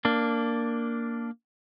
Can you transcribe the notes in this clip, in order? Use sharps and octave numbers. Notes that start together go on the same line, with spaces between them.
A#3 D4